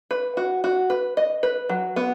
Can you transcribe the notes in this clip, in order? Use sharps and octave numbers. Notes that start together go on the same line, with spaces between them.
B4
F#4
F#4
B4
D#5
B4
F#3
B3